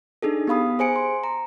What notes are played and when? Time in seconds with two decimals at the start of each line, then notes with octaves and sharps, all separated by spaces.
0.22 D4 D#4 G#4 A4
0.47 B3 G4 F5 B5 D#6
0.79 G#4 C5 G#5 C#7 D7
0.96 C6
1.24 A#5